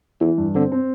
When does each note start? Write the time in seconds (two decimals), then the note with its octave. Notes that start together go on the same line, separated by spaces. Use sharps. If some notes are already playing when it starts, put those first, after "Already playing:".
0.20 E2 E3
0.38 G2
0.55 D3 C4
0.72 C4